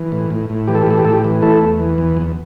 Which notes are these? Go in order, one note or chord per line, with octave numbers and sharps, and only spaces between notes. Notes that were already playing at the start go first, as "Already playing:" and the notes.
Already playing: E3
A2
A2
A2
E3 G4
A4
G4
A2 A4
G4
A2 A4
G4
E3
A3 E4 A4
E2
E3
E2
E2